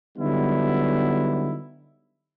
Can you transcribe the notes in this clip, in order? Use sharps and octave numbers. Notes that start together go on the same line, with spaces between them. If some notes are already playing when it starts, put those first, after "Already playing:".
D3 F#3 G3 B3 D#4 E4